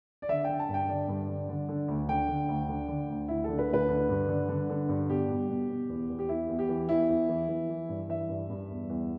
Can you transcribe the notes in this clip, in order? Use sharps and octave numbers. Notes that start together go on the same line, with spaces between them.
D5
D3 E5
D3 G5
A5
G2
G5
D3 D5
G2
D3
D3
D3
D2
D3 G5
D3
D2
D3
D3
D2
D2 E4
D3 A4
B4
D2 B4
D3
G2
D3
D3
D3
G2
B2 G4
B2
B2
B2
E2
E2
G4
E2 E4
E2
G4
E3
E2 E4
E2
E3
E3
E3
G2
E3 E5
G2
G2
E2
E2